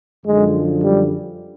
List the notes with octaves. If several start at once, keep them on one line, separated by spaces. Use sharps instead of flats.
F#2 D3 F3 G#3
G3